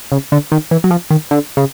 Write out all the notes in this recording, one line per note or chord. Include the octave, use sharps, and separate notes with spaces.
C#3
D3
D#3
E3
F#3
F3
D#3
D3
C#3